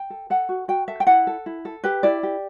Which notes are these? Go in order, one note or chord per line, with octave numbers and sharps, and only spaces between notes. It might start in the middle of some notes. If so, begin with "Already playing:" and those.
Already playing: G5
A4
A4 F#5
F#4
F#4 G5
A4 E5
G5
E4 F#5
A4
E4
A4
G4 B4
E4 D5
G4